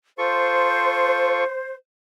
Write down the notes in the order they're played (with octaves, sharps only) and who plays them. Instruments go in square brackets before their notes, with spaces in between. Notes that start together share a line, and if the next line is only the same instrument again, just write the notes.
[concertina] F4 A4 C#6 [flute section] C5